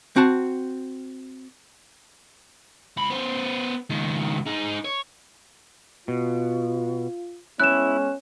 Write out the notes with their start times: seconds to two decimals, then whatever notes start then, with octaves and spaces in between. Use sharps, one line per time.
0.16 C4 F#4 A5
2.97 C#2 B5
3.10 B3 C5
3.90 C#2 D#3
4.46 D#4 G#4
4.85 C#5
6.08 B2 F4
7.60 G#3 B3 C#4 E4 F#6 E7